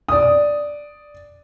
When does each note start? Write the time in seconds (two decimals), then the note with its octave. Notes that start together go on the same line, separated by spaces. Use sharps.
0.08 D5 D#6